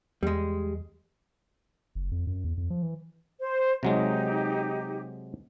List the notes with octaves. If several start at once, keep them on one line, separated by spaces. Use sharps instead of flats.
E2 G3 G#3
F#1
F2
F#2
E2
F2
F3
E3
C5
C3 F#3 G#3 D#4 G4